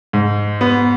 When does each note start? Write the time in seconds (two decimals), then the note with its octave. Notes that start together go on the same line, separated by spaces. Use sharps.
0.13 G#2
0.61 B3